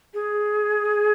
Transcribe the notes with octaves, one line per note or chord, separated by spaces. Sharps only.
G#4